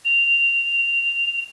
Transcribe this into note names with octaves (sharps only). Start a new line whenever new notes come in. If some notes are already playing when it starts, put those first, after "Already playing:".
F7